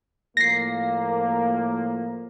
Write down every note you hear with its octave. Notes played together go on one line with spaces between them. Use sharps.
A2 F3 A#3 A#6 C7